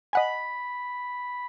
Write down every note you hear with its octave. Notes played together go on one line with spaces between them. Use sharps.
D#5 F#5 G#5 B5